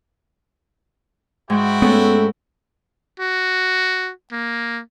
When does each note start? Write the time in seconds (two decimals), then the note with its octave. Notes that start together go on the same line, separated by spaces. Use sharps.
1.50 G#2 E4 F#4 G5
1.82 A3 B3 C#4 A4
3.20 F#4
4.32 A#3